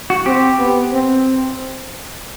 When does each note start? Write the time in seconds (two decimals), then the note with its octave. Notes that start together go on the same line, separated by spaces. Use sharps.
0.10 F#4
0.26 C4 G4
0.59 B3
0.93 C4